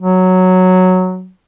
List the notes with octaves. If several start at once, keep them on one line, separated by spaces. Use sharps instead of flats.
F#3